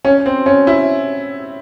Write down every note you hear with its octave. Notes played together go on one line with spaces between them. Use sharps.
C#4
C4
C#4
E4